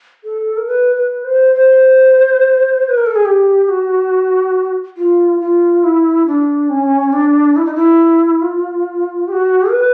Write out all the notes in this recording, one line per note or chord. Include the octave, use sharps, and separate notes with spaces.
A4
A#4
B4
B4
C5
C5
B4
A#4
A4
G#4
G4
F#4
F4
F4
E4
D4
C#4
D4
E4
D#4
E4
F4
G4
F#4
B4